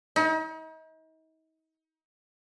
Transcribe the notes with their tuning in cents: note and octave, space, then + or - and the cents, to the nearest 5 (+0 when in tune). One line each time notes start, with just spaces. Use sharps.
D#4 +40